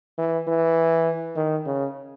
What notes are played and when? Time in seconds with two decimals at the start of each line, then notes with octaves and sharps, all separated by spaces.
0.18 E3
0.47 E3
1.36 D#3
1.66 C#3